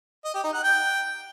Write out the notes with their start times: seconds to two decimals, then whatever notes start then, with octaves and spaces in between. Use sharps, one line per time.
0.25 D#5
0.34 G4
0.44 D#4
0.54 F#5
0.63 G5